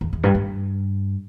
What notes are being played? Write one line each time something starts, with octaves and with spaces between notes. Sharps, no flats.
E2
E2
G2
G2